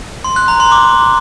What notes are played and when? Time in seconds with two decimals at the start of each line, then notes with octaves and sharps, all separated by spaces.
0.24 C6
0.36 F#6
0.48 A#5
0.60 C6
0.72 D6